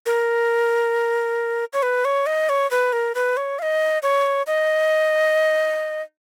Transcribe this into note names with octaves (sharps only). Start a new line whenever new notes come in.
A#4
C#5
B4
C#5
D#5
C#5
B4
A#4
B4
C#5
F5
D#5
C#5
D#5